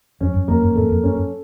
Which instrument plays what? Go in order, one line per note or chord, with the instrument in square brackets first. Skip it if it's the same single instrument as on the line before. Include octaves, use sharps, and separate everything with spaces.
[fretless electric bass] F2 [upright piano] C#4
[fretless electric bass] F#2
[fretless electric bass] F2 [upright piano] A#3
[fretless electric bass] F#2
[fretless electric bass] F2 A2 [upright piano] A4
[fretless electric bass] F2
[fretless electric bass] F#2 [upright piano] C#4
[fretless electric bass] F#2